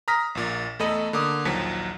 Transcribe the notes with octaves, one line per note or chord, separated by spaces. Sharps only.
A#5 D#6 F6 A#6 B6
A#1 A#2
E2 A3 A4 D#5 B5 D#7
D3 A#3 D6 D#6
A#1 D#2 F3 F#3 B6 C#7